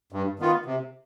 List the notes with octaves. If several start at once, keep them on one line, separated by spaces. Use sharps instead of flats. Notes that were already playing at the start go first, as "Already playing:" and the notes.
G2
D#3 B3 F4
C3